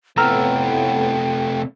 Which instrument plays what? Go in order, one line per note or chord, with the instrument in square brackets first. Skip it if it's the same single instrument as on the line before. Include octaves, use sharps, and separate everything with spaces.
[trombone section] A2 B3 [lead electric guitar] C3 A3 [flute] G5 [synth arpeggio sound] A#5 E6 F6